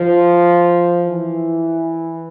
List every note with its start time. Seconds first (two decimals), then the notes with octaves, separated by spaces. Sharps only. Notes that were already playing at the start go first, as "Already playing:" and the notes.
Already playing: F3
1.05 E3